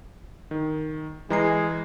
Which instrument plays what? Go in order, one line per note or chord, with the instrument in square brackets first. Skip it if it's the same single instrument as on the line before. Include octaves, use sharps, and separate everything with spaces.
[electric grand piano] D#3
[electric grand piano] E3 A#5 C7 [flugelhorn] G#3